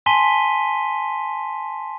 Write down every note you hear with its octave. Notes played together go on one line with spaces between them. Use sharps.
G#5 A5 C6 B6 D#7 G7